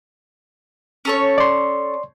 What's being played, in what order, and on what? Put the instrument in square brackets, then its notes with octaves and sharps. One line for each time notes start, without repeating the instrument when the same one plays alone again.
[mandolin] C#4 A4 C#5
[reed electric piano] D5 C6